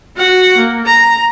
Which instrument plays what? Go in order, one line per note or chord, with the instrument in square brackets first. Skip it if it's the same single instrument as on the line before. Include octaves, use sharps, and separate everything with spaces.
[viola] F#4 F#5
A#3
A#5